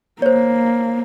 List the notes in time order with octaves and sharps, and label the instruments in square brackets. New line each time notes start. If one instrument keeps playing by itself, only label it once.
[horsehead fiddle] A#3 [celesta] C5 C#5